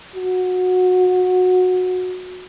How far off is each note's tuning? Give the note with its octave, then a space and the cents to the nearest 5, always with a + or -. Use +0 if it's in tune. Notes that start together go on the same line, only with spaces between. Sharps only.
F#4 -15